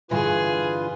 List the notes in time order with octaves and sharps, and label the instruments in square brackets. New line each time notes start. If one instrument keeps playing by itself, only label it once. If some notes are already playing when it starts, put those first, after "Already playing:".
[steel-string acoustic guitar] G2 D3 E3 [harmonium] F4 B4 [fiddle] G#4